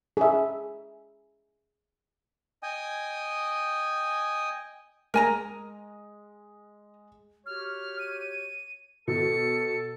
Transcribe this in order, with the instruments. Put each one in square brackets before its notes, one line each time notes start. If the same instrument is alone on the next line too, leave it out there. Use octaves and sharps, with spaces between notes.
[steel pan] G#4 E5
[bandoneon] D#5 G5 G#5 D#6
[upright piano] G#3 [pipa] A#4 G#5 A#5
[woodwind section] F#4 G4 C#5 [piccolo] F6
[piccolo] D#7
[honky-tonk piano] B2 [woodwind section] A4 [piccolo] C#7